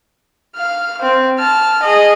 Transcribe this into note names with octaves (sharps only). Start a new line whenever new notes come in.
F5 F6
C4 C5
A5 F6
G#4 D#5